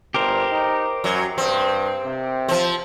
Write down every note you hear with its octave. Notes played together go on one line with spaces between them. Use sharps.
G1 G4 A#4 C5
D#4
F#2 F#3
G2 C4
C3
F3 C4